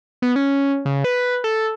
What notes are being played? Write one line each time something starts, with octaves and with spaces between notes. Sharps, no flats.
B3
C#4
C#3
B4
A4